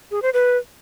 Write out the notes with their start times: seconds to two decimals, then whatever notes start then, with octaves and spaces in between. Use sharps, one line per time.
0.11 G#4
0.22 C5
0.34 B4